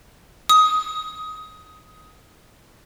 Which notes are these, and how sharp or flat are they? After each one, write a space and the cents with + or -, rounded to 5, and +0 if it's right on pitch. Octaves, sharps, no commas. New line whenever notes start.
D#6 +15